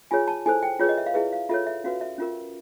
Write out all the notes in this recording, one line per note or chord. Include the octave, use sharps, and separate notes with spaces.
F4 G#4 C#5 G#5
A5
E4 A4 C5 G#5
G5
F4 G#4 B4 C#5
D#5
E5
F5
E4 G#4 B4 E5
F5
F4 A4 C#5 E5
E5
C#4 F#4 B4 F5
E5
C#4 F4 A#4